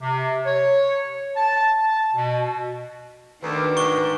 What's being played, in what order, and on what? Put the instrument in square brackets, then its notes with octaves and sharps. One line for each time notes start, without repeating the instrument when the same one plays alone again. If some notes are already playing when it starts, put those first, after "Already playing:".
[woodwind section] C3
C#5
A5
A5
B2
[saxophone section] D2 [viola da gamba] D#3 D4 [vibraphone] B4
[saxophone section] G#2 [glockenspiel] C#6 G7